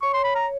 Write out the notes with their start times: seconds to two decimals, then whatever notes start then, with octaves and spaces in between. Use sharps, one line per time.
0.02 C#5 C#6
0.14 C6
0.24 B5
0.35 A#5